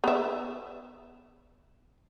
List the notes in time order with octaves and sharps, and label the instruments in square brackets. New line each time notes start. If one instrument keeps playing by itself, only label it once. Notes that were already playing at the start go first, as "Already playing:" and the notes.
[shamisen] B3 E5